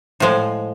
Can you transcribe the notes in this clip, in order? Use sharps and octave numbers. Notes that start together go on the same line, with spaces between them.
A2 F3 G#3